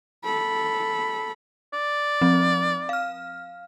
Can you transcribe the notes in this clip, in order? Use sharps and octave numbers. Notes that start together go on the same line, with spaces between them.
A4 B5
D5
F3 C4
F5 F6